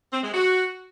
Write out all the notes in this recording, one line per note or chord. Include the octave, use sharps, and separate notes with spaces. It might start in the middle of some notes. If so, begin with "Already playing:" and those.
C4
G#3
F#4